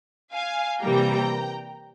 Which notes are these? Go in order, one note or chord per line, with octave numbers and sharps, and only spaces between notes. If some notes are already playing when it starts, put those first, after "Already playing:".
F5 G#5
C3 E3 G3 A#3 G5 A#5